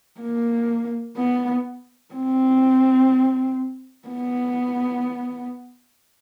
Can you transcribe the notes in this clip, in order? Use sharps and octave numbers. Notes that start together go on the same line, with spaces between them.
A#3
B3
C4
B3